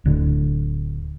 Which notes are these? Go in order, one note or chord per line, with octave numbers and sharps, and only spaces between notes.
D1 D3